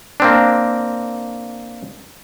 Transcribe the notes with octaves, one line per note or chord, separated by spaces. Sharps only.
A#3 C4 D4